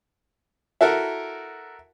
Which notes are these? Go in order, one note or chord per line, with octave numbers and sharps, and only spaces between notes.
E4 F#4 A4 A#4